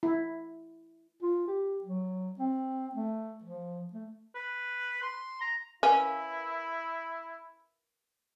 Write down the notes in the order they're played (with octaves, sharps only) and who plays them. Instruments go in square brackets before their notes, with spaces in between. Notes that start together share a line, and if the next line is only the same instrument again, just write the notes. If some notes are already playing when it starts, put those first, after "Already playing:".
[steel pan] E4
[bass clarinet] F4
G4
F#3
C4
A3
F3
A3
[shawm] B4
C6
A#5
[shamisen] C#4 [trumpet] E4 [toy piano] A#4 B4 F5